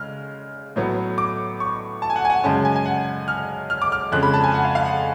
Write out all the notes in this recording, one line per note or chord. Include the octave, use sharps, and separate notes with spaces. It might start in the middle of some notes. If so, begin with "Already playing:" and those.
Already playing: C#3 G#3 F6
A2 F#3 B3
D6
C#6
A5
G#5
F#5
G#5
F#5
F#2 C#3 G#3 C#4 A5
G#5
G#5
F#5
F6
F6
D6
F6
F2 C#3 G#3 F#6
B5
A5
G#5
F#5
F5
F5
F#5